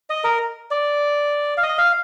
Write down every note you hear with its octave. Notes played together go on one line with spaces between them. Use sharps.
D#5
A#4
D5
F5
D#5
F5